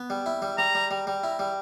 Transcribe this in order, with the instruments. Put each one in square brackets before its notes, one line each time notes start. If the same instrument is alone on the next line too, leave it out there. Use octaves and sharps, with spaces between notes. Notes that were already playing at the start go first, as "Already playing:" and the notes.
Already playing: [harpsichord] B3
G3
E4
G3
[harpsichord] G3 [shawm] A#5
[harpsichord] G3
G3
G3
E4
G3